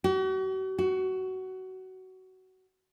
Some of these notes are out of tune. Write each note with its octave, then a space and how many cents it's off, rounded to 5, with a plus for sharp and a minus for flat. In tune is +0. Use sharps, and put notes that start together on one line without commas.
F#4 +40
F#4 +20